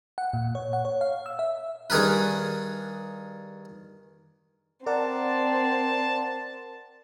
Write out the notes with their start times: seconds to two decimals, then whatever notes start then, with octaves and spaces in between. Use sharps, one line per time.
0.18 F#5
0.33 A#2
0.55 C#5
0.73 F#5
0.85 C#5
1.01 F5
1.26 E6
1.39 E5
1.90 G2 D#3 G#4 A#4 B4
4.86 C4 A#4 D5 F#5 A5